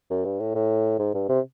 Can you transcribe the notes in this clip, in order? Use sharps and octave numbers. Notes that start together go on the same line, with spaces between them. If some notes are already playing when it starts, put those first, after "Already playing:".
F#2
G2
A2
A2
G#2
G2
C3